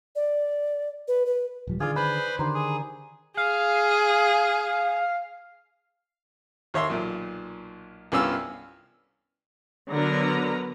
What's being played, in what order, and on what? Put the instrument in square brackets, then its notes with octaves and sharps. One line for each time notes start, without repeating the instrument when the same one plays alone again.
[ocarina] D5
B4
B4
[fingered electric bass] D#1 F3 G3
[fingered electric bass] D3 D#3 [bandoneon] F4 [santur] G#4 D5
[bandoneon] B4 C5 [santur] B5
[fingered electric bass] D3 D#3 [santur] G3 C5 A#5
[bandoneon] G#4
[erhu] G#4 [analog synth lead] F5
[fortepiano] D#2 C#5 E5 C6
B1 A#2
C2 G2 B3 C#4 F4 E6
[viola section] D3 F#3 B3 A#4 B4 A#5